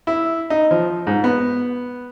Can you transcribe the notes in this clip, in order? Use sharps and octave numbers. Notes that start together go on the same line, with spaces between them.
E4
D#4
F3
G#2
B3